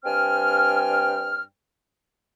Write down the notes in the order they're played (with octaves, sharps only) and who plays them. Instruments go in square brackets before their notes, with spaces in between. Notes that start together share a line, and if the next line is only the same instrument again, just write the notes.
[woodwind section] G2 C4 G5 G#5 F6